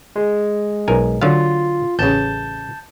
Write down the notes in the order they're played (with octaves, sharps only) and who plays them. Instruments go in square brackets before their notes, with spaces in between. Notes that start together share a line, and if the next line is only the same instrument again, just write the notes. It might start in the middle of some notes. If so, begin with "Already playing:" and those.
[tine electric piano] G#3
[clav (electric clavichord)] B1 A#4 G#5
[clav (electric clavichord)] D3 F#3 F5 [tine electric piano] F4
[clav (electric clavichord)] A1 C#3 [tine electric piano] A5 G6